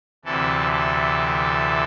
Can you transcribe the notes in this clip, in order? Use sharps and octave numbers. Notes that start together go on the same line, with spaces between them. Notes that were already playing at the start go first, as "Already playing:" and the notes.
D2 C3 E3 A4
A4